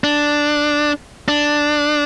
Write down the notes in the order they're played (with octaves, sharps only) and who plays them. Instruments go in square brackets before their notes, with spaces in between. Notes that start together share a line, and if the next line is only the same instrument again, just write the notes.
[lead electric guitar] D4
D4